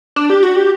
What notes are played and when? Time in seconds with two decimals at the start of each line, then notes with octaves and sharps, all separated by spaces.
0.16 D4
0.30 G4
0.43 F#4
0.56 G4